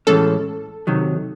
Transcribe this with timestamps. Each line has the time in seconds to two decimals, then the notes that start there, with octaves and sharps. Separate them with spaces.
0.07 A2 E3 G#3 C#4 A4
0.87 C3 D#3 F#3